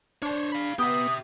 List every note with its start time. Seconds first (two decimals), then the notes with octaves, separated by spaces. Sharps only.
0.22 D4 C5 C#5
0.52 F5 B5
0.79 B3 G4 E5 D#6